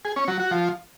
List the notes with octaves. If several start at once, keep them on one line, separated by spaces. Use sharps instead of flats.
G#4
C#4
F#3
F#4
F3